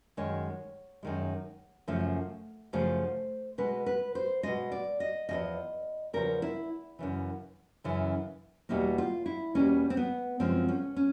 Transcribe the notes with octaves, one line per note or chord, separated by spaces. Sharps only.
F#2 D#3 G#3 C#5
F#2 D#3 G#3
F#2 C#3 F3 A3
F#2 C#3 F3 A3 C5
B2 G#3 B4
B4
C5
B2 G#3 D#5
D5
D#5
E2 C#3 F3 D#5
E2 C#3 F3 A#4
E4
F#2 C#3 E3
F#2 C#3 E3
E2 B2 G3 A#3 E4
F4
E4
E2 B2 G3 A#3 C#4
C4
B3
F#2 C#3 F3 G#3 C4
C#4
C#4